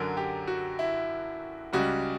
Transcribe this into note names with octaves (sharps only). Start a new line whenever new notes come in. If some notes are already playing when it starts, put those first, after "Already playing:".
Already playing: F#2 D3 F#3 A#4
G4
F#4
E4
C#2 C#3 G3 F#4